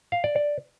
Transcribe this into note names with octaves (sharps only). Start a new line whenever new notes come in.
F5
D5
D5